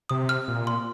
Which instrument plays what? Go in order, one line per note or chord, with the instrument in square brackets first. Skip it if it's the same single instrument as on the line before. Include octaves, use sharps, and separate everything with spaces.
[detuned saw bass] C3 [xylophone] D#6
[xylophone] F6
[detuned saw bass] A#2
[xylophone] C6